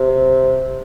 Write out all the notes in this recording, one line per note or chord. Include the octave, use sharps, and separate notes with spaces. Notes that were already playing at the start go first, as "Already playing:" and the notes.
Already playing: C3